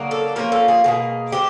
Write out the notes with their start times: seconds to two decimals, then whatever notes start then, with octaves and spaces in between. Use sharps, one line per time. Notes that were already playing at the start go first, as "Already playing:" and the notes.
Already playing: C#3 F#3 A#3 D4
0.11 A4
0.36 F3 A#3 C#4 F4 A#4
0.52 A4
0.68 G#4
0.84 B2 F#3 A#3 G#4
1.32 G#3 C4 G4